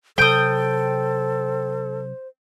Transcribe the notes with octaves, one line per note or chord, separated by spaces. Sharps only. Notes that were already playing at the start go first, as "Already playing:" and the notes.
C3 F#3 A4 C5 G5 D#6